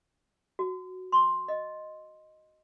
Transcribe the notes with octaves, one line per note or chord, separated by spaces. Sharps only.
F#4
C6
D#5